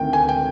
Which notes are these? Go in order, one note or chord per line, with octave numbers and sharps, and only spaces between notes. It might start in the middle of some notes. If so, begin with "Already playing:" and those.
Already playing: D2 C3 D#3 G5
G#5
G5